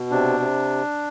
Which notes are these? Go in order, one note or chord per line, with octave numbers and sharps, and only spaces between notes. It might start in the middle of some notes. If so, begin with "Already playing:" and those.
Already playing: B2
C3 D4
C3